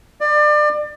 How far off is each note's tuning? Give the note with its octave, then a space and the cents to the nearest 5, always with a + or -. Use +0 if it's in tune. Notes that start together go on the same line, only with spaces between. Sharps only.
D5 +30